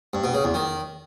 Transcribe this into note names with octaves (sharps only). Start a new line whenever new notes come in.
G2
B2
C#3
E2
D#3